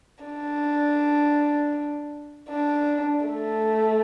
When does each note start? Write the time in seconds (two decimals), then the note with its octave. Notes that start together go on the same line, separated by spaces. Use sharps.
0.24 D4
2.50 D4
3.26 A3